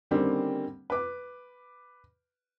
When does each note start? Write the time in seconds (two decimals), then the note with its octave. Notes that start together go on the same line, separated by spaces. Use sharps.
0.11 D3 D#3 G3 A#3 C4 C#4
0.90 B4 D6